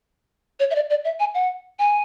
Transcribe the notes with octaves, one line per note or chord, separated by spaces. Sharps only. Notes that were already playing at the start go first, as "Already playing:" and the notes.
C#5
E5
D5
D5
E5
G#5
F#5
G#5